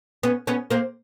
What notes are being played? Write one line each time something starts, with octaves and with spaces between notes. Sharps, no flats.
B3 C#4
B3 C#4
A#3 C4